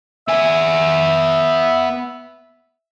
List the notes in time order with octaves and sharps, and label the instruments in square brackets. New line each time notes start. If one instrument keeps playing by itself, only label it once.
[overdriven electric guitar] B3 G#5 [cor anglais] E5